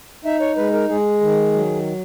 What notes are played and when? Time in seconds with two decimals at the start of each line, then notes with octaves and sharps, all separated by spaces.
0.25 D#4 E5
0.41 C#5
0.57 G#3 B4
0.73 A#4
0.89 G#3 G#4
1.21 D#3
1.53 F#3